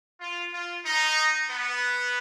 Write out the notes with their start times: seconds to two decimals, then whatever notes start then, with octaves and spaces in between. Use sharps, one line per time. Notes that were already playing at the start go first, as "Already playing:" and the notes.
0.21 F4
0.54 F4
0.86 D#4
1.50 B3